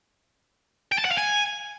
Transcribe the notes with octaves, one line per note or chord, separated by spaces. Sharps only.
G5
A5
F#5
F5
G#5